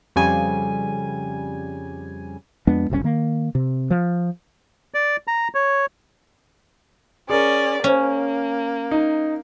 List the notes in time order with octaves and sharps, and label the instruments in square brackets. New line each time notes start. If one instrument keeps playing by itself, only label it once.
[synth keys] F2 C#3 G3 G#5
[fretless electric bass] F2 G#3 B3 D4
F#1 C2 A#2 C#4
D#3 A#3
C3
F3
[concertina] D5
A#5
C#5
[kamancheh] C#4 D5 [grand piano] G#4 A#4
[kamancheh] A#3 [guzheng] C#4
[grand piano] D#4